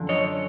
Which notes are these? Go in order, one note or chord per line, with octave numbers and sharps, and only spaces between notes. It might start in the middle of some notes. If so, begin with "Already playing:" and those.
Already playing: F#2 D3 F3
C#5 D#5